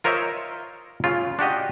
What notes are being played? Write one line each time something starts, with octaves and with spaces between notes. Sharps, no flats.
F4 A#4 C5 C#5 D#5 E5
C#3 F4
D4 F#4 G4 D#5